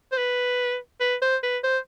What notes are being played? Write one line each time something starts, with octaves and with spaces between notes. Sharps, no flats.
C5
B4
B4
C5
B4
C5